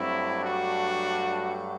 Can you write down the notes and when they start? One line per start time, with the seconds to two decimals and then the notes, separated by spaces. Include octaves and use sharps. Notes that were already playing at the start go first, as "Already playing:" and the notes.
Already playing: G2 F#3 A3 C4 E4
0.41 D4 F#4